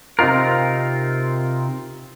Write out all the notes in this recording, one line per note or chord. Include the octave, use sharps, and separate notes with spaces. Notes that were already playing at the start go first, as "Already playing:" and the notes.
C3 C4 D#4 F4 A#4